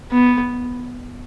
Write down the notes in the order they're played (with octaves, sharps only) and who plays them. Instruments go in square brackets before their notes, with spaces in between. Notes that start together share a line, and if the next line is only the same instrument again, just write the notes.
[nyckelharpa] B3